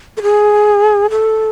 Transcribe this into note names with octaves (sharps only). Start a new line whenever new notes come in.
A4
G#4
A4